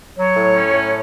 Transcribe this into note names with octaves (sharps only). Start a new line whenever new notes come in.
F#3 C#5
A2
C#4
A2